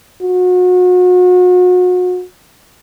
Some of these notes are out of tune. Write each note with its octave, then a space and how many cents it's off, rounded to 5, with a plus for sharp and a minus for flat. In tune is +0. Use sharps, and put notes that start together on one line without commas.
F#4 -35